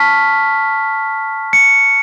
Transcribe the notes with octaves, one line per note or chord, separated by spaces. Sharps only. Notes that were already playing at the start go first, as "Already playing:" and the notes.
Already playing: A5 C#6 F6 B6
C#7